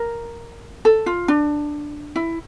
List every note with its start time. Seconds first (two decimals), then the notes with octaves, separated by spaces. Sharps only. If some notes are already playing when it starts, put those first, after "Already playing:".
Already playing: A#4
0.85 A4
1.06 F4
1.28 D4
2.16 E4